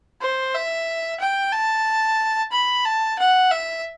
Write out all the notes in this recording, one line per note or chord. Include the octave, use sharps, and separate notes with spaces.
C5
E5
G5
A5
B5
A5
F#5
E5